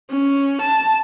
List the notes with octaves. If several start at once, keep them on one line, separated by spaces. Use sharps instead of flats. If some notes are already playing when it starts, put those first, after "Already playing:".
C#4
A5